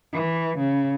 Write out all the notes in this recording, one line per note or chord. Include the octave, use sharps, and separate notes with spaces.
E3
C#3